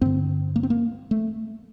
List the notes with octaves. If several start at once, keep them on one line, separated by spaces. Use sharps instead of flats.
G2 D3 C4
A#3
C4
A#3
A3